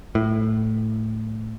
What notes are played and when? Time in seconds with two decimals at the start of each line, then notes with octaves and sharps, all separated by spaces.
0.15 A2